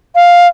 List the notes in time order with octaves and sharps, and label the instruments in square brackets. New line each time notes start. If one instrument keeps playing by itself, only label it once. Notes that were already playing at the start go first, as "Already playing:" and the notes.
[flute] F5